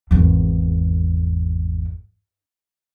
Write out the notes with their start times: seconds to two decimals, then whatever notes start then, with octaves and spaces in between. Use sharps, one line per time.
0.11 G#1 E2